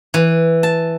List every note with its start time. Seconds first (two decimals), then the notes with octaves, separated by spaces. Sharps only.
0.14 E3
0.63 A5